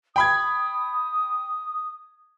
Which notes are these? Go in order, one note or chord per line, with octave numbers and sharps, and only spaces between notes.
G5 B5 D#6 G#6